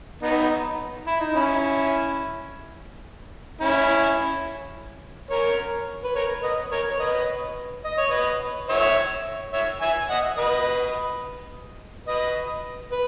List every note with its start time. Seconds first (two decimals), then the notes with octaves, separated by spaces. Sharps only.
0.22 B3 D#4
1.07 E4
1.20 D#4
1.35 C#4 E4
3.61 C#4 E4
5.30 A#4 C#5
6.04 B4
6.15 A#4 C#5
6.43 B4 D#5
6.71 A#4 C#5
6.90 C#5
7.00 B4 D#5
7.85 D#5
7.98 C#5
8.11 B4 D#5
8.69 C#5 E5
9.53 C#5 E5
9.81 E5 G#5
10.10 D#5 F#5
10.38 B4 D#5
12.07 B4 D#5
12.92 B4